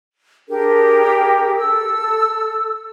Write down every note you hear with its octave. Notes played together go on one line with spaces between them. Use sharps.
D4 G4 G#4 A#4
A4 E6